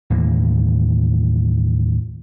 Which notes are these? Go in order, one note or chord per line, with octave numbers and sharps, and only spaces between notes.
D#2 A2 E3 A#3